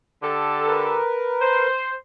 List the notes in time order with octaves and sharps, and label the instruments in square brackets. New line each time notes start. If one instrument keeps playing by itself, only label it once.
[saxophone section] D3 G4 A4
[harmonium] A#4 B4
[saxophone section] C5